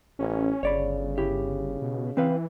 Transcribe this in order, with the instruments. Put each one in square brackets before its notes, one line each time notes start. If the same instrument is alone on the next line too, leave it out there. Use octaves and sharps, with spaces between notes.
[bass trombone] A1 [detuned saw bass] C#4
[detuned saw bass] G1 [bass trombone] C#3 [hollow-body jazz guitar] C#5 D5 B5
[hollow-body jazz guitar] E4 G4
[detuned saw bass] B2
[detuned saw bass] E3 [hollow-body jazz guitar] C4 B4 F5